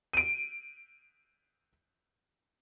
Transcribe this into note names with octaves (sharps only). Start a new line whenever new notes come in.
D7 D#7